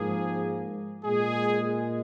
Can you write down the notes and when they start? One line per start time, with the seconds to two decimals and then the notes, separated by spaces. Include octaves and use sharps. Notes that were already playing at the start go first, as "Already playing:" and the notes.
Already playing: G#2 F3 A#3 G#4
1.05 A#2 G#3 G#4